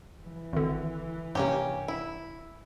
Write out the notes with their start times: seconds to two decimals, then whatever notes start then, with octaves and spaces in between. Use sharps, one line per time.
0.23 E3
0.53 G#1 D3
1.35 G2 C3 A#3 C#4 G4
1.88 E4